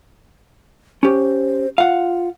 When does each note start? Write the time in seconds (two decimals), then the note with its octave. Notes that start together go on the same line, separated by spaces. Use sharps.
1.03 C#4 G4 C5
1.78 F4 F5 F#5